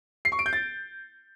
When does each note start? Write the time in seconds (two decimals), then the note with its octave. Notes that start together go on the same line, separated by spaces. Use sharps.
0.25 C7
0.32 C#6
0.39 D7
0.46 G6
0.53 A6